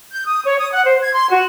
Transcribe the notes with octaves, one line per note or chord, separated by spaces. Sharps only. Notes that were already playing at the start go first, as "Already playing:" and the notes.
G6
D#6
C#5
D#6
F#5
C5
G#6
C6
F#4